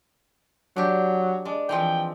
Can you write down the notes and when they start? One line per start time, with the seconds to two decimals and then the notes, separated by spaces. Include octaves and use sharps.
0.76 F#3 D4 G4
1.45 G#3 D4
1.69 E3 F3 C4 G5